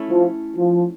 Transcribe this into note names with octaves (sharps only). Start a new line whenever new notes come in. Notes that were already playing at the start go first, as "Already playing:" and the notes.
Already playing: A3 C#4 E4
F3
F3